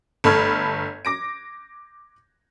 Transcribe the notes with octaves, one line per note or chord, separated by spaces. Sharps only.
G1 A3 A4 B5 F6 G#6
D6 A#6 D7